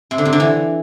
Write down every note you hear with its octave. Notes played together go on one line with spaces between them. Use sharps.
C3
D3
C3
D3
E3